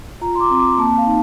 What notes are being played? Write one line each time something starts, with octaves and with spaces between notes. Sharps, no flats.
F4 A#5
C6
D6
C4
D6
A#3 A5
F5
D#4